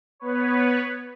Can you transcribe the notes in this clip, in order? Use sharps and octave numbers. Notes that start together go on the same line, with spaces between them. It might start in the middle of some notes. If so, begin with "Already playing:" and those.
B3 B4 C#5